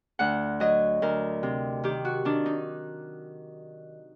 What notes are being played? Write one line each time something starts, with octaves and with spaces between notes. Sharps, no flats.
D2 F#5
F#3 D#5
D2 A#4
C3
D#3 G4
F#4
D#3 D4
D#4